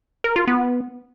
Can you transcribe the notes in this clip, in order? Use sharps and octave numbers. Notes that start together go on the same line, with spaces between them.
A#4
F4
B3